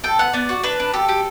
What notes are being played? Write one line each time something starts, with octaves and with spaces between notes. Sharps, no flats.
A4 G5
B3 F#5
B3 D5
F#4
D4 B4
D4
G4 A4
G4